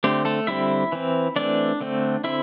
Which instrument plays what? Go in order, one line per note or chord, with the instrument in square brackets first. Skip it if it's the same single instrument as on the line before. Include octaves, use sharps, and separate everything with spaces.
[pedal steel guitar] D3 A3 C4 G4
A3 A4
D3 G3 C4 E4 E5
E3 C4
E3 A3 C4 D4 D5
D3 A3 C4
D3 C4 E4 E5